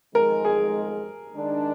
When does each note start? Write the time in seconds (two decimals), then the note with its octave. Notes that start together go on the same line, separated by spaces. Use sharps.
0.14 F2 D#3 G#3 A#4
0.45 G#4
1.35 D#3 G#3 D4